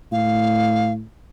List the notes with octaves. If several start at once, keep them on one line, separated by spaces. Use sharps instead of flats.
A2 F5